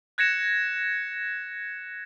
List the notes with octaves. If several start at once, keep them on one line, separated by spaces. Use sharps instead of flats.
F#6 G#6 A#6 C#7 E7